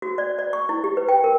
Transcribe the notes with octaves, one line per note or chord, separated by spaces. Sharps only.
F#4
D5
D5
C#6
E4
G4
B4
G5
A#4